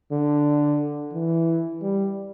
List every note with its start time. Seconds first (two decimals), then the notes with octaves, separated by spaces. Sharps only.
0.12 D3
1.14 E3
1.82 G3